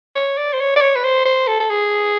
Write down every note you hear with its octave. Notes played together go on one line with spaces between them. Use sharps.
C#5
D5
C5
C#5
D5
C#5
B4
C5
C5
A4
A4
G#4